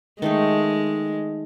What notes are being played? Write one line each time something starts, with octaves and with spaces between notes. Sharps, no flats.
D#3 G#3 A3 D#4